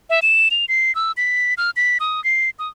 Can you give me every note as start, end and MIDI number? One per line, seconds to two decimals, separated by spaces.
0.10 0.20 76
0.22 0.49 100
0.51 0.65 101
0.68 0.94 96
0.95 1.12 88
1.17 1.54 95
1.58 1.70 89
1.76 1.98 95
2.00 2.23 87
2.24 2.50 96
2.59 2.68 87